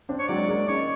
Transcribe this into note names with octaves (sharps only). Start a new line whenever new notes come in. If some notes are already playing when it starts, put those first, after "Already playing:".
C4 D4
C#5
F#3 G#3 D5
G#3 A#3
C#4 D#4 C#5